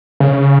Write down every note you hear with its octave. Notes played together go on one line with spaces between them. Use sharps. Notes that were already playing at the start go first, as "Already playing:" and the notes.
C#3